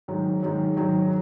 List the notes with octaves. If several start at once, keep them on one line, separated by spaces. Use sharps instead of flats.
G#2 D#3 F#3
G#2 D#3 F#3
G#2 D#3 F#3